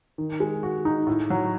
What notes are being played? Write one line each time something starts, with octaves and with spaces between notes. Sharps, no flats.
D#3
G#3
F#4
D#4
A2
F#3